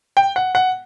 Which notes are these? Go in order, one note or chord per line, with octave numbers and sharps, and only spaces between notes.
G5
F#5
F#5